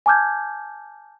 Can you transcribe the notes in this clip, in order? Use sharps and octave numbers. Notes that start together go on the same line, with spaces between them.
G#5 A5 D6 F6 G6 G#6